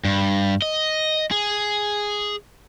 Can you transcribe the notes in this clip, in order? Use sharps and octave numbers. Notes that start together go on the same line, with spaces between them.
G2
D#5
G#4